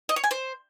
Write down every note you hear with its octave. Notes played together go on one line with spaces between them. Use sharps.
D#5
C#5
G#5
C5